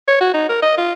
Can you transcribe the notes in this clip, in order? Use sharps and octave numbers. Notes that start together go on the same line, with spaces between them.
C#5
F#4
D#4
A#4
D#5
F4